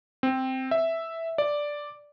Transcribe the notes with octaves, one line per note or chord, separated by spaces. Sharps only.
C4
E5
D5